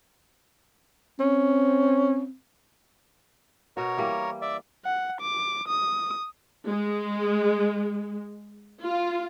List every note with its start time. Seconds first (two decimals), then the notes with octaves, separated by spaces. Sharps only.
1.20 C4 C#4
3.77 B2 F#4 A#4 C#5
3.98 E3 G3 A#3
4.42 D5 E5
4.86 F#5
5.21 D6
5.68 D#6
6.67 G#3
8.85 F4